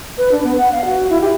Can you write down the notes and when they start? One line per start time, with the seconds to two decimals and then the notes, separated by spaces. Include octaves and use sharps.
0.18 B4
0.32 D4
0.44 B3
0.58 F#5
0.72 F5
0.85 F#4
1.10 E4
1.21 G4